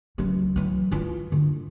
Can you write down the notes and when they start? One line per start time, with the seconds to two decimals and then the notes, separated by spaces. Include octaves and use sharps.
0.18 C#2 F#3
0.56 E3 F#3
0.91 E3 F4
1.32 D3